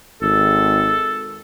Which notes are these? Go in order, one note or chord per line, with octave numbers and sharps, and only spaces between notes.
G#1 A4